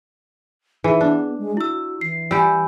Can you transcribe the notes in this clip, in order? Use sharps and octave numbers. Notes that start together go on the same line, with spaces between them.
E3 D#4 G#4
B3 D4
G#3
E4 F#4 E6
E3 C7
G3 G4 G#5 B5 E6